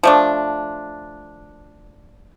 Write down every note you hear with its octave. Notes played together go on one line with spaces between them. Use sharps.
F3 A3 D4